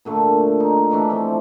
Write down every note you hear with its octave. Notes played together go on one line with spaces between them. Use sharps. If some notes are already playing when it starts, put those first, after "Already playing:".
A#2 D3 A3
D#4
E3 A3 D4
F3 C4